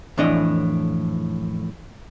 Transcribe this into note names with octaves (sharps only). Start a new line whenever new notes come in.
F2 A2 E3 D4 C#5 D#5